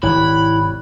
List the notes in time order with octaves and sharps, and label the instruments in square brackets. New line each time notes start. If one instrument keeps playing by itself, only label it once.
[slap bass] G#1 C3 [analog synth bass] E4 [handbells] C#5 D5 F#6 [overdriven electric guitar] B5